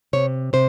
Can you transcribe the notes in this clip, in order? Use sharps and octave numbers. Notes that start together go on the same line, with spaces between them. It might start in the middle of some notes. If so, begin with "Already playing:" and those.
C3 C#5
C3 C5